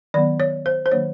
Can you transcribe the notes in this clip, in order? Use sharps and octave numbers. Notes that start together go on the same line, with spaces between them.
D#3 F#3 B3 D5
C#5
C5
C5
D#3 F#3 A#3 D4 C#5